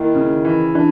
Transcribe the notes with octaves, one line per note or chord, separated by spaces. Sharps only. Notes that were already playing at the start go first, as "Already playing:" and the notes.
Already playing: D#2 D#3 E4
C#3
E3
E3 D4